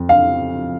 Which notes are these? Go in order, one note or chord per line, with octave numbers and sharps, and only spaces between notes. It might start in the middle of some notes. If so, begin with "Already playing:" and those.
Already playing: F2
F5